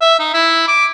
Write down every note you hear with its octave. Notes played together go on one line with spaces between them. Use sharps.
E5
D#4
E4
D6